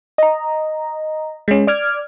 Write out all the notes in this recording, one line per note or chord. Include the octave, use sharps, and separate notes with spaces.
D#5 A#5
G#3 C#4
D5 D6 F6 G#6